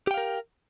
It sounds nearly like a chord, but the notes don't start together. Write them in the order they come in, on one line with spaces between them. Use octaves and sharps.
G4 G5 F5 A#4